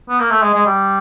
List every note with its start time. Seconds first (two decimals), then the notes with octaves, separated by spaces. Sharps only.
0.10 B3
0.20 A#3
0.31 A3
0.42 G#3
0.55 G#3
0.66 G3